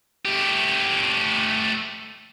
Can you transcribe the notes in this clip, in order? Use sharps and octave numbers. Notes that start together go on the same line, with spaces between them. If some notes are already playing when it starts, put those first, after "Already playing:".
A3 G4